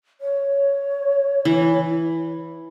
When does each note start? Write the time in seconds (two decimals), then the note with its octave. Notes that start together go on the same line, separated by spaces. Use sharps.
0.21 C#5
1.45 E3